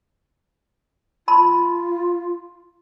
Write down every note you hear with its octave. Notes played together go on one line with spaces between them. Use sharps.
F4 A5 B5